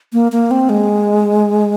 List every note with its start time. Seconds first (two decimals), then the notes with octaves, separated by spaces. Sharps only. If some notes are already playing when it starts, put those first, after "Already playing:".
0.13 A#3
0.32 A#3
0.51 C4
0.69 G#3